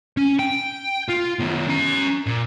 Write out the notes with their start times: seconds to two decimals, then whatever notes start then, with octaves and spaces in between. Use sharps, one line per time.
0.17 C#4
0.39 G5
1.08 F4
1.39 D#3 B3
1.68 C#4 A#5
2.27 A#2